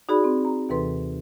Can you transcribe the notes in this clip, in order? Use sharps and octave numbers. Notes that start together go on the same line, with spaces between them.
D#4 F#4 G#4 D5 B5
C4
A#5
D#2 C3 E3 A4 B4 C6